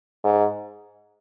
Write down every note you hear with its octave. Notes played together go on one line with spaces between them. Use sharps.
G#2